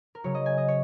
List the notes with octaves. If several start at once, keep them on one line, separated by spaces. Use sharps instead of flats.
A#4
C#3 F#3 C#5
D#5
G#5
D#5
C#5